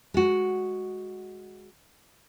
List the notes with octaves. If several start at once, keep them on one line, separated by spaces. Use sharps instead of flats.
G#3 F#4